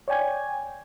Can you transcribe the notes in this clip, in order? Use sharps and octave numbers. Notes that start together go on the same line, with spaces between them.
C#5 D5 G5 G#5 G#6